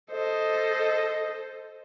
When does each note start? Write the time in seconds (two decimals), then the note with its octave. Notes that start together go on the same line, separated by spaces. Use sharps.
0.11 A4 C5 D#5